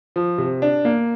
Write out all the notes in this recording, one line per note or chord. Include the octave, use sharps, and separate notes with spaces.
F3
C3
D4
A#3